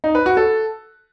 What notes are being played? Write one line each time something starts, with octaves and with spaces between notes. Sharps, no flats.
D#4
B4
F#4
A4